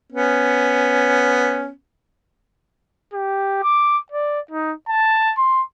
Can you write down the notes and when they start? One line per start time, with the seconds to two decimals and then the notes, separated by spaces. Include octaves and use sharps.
0.12 B3 C#4
3.13 G4
3.63 D6
4.12 D5
4.51 D#4
4.89 A5
5.37 C6